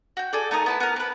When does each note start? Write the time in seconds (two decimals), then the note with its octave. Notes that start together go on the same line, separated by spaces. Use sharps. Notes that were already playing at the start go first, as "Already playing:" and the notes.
0.17 F#4 G5
0.33 G#4 A4 D5
0.51 A3 D#4 A#4 D#6
0.66 B3 E4 A5
0.80 B3 A#4
0.96 C4 B4